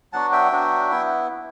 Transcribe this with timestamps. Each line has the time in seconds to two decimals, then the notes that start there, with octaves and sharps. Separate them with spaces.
0.13 F#3 B3 D4 F#4 F#5 A5
0.32 E5 G5
0.52 F#3 B3 D4 F#4
0.91 B3 E4